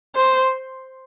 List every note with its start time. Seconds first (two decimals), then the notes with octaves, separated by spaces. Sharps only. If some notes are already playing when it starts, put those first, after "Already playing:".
0.16 C5